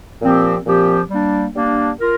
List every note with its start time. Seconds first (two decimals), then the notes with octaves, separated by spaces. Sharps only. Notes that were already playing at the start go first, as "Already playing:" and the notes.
0.22 A#2 F3 C4 G4
0.66 A#2 F3 C4 G4
1.10 G3 A#3 D4
1.55 G3 A#3 D4
2.00 F4 A#4